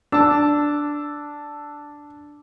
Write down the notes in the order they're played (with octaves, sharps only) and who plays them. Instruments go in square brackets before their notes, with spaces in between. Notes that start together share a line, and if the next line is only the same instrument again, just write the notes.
[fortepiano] D4 [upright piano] A5 E6